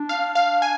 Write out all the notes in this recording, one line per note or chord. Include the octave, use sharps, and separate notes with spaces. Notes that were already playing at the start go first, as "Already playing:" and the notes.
Already playing: D4
F5
F5
G#5